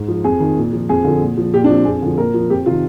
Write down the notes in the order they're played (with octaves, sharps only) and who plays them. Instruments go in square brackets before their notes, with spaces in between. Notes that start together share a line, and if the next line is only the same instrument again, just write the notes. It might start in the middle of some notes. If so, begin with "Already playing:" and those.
Already playing: [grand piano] G#2
F3
F2 G#4
D#3
A#2
F3
F2 G#4
D3 F3
A#2
F3
A#2 G4
D4
F3 C4
F2 G#4
D3 F3
A#2 A#4
F3
F2 G4
C3 F4
D#3